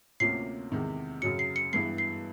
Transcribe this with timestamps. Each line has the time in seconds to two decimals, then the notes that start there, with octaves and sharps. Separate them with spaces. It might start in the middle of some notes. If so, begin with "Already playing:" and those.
0.20 D2 C3 F3 A#3 C#4 C7
0.72 E2 C3 D#3 G#3
1.22 F#2 C#3 F#3 C#7
1.39 C7
1.56 C#7
1.73 G2 E3 G#3 B3 E4 C7
1.98 C7